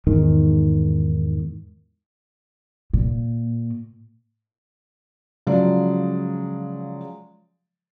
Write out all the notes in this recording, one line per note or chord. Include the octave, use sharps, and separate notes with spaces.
E2 G#2 D#3
A#2
C#3 F3 F#3 G#3 D5